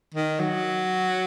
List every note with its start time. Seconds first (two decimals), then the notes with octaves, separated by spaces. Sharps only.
0.14 D#3
0.39 F#3